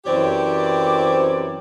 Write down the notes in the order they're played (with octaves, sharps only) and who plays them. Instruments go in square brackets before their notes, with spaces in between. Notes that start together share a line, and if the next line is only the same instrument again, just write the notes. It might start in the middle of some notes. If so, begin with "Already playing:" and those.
[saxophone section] F#2 E3 C4 G4 C#5 D5